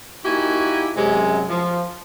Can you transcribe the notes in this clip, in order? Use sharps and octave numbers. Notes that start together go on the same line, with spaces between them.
A#3 D#4 E4 F#4 G4 G#5
F#2 C3 G#3
F3